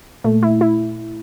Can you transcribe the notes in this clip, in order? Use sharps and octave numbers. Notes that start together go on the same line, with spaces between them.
A#2 A3
E4
E4